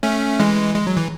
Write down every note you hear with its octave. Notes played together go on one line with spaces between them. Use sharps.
A3 C#4
E3 G#3
G#3
F#3
E3